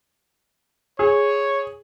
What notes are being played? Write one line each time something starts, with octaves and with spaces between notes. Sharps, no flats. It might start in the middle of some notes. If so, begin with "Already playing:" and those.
G#4 C#5